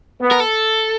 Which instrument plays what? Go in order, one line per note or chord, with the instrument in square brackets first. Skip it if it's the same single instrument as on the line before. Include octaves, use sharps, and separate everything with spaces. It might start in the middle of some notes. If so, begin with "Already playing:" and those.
[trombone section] B3
[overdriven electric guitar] A#4
A4